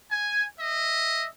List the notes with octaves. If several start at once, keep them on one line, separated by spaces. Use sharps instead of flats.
G#5
D#5 E5